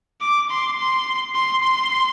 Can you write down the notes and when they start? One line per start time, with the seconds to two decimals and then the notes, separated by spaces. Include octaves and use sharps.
0.21 D6
0.50 C6
0.78 C6
1.35 C6
1.63 C6